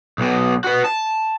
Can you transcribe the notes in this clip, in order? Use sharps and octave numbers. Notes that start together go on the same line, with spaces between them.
B1 B2
F#4 B4
A5